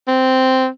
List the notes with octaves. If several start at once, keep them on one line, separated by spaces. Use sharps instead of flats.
C4